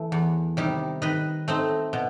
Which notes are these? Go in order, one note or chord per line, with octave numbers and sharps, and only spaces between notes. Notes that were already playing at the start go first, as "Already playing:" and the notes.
Already playing: E3 A3
E2
C3 D#3 G3 D#4
D#3 B4 D#5
A3 C4 D#4
B2